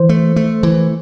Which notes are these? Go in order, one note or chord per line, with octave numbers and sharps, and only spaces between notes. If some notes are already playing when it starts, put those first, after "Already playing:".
Already playing: E3 C5
A3
A3
E3